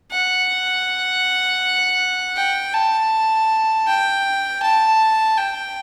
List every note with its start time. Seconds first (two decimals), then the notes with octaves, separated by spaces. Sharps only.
0.11 F#5
2.36 G5
2.73 A5
3.87 G5
4.62 A5
5.37 G5